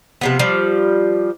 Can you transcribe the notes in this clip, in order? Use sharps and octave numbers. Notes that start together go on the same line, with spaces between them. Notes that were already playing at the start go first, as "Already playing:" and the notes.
C3 F3 B3
F3 G3